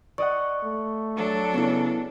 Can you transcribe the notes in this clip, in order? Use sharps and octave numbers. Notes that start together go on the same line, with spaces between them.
D5 D#5 F#5 C#6
A3
F#3 D4 A4
C#3 B3 E4